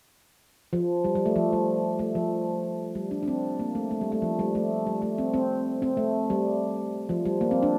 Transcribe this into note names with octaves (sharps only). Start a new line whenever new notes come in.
F3
G3
G3
A3
F3
G3
A3
F3
G3
D4
D4
C4
A#3
A3
A3
G3
A3
F3
G3
A3
G3
A3
C4
C4
C4
A3
G3
F3
G3
A#3
C4
D4